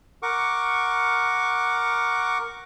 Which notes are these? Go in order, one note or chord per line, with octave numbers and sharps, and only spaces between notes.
A#4 F#5 C#6 D6